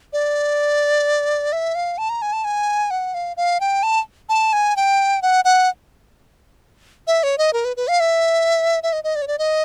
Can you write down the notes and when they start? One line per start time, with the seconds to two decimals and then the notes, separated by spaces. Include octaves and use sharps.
0.13 D5
1.53 E5
1.75 F5
1.98 A5
2.09 A#5
2.22 G#5
2.33 A5
2.44 G#5
2.91 F#5
3.14 F5
3.37 F5
3.61 G5
3.83 A5
4.29 A5
4.53 G#5
4.76 G5
5.22 F#5
5.45 F#5
7.07 E5
7.23 C#5
7.38 D#5
7.53 A#4
7.65 B4
7.77 B4
7.88 F5
8.00 E5
8.83 E5
8.93 D#5
9.04 D#5
9.16 D5
9.22 C#5
9.28 D5
9.38 D#5